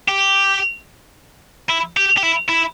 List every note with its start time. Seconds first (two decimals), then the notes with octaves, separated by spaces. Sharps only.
0.09 G4
1.69 E4
1.97 G4
2.18 G4
2.23 E4
2.49 E4